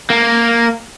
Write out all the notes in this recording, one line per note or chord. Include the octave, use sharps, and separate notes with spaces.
A#3